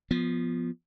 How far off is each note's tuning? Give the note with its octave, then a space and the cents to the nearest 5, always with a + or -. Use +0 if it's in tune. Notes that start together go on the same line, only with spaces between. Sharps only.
F3 +0 B3 +0